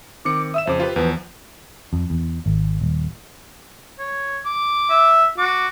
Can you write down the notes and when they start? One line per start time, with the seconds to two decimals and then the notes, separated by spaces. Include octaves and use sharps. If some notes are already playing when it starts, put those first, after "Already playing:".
0.25 D#3 C4 D6 C#7
0.54 E5 D#6 E6 E7
0.67 F2 C#3 C5 D6
0.80 F4 G4 B4
0.96 E2 F3 B4
1.93 F2
2.10 E2
2.46 G#1
2.81 D#1
3.99 C#5
4.45 D6
4.90 E5
5.38 F#4 D6